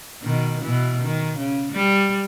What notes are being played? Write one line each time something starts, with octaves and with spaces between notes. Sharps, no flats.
B2 D#3
B2 E3
D#3
C#3
G3